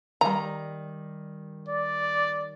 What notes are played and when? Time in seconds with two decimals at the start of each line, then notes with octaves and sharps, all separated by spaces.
0.21 D#3 G3 A#5
1.69 D5